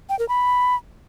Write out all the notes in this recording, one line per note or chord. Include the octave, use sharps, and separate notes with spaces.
G5
A#4
B5